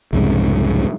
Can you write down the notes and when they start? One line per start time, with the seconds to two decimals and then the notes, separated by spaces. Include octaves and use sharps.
0.13 C2 F2 G#2 C#3